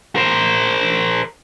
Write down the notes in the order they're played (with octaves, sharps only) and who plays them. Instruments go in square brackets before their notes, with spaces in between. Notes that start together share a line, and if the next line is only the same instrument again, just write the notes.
[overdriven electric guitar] A#4 C5